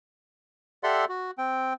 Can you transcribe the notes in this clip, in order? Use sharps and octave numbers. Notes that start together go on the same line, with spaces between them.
G4 A4 D5 E5 F#5 C6
F#4
C4 G5